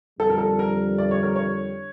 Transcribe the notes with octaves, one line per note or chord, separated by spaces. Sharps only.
F2 D3 G3 A4
A#4
A4
A#4
D5
C#5
A#4
C#5